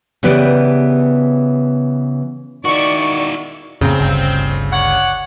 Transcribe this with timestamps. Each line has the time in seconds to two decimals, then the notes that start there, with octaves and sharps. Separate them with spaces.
0.23 C#3 E3 B3 G4 B4 D5
2.65 D#3 E4 F#4 D5 C#6
3.81 F2 A2 C#3 A#3 C4
3.98 G1 D2 G2
4.72 C#5 D5 F#5